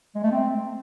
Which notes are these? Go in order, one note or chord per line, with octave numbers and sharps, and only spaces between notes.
G#3
A3
C4